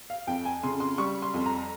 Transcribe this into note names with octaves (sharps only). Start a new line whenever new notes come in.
F5
F2 G5
G#5
C#3 C6
C6
G3 C#6
C6
F2
A#5